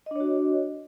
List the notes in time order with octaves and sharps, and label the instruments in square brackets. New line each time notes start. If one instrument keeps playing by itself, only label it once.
[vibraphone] D#5
D4
C#5
F#4